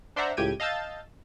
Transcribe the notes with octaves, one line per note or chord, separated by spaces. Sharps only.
D4 C5 D5 E5 F#5 A#5
C#2 A2 G4 G5 G#6 D#7
D#5 F5 A5 E6 G6 A6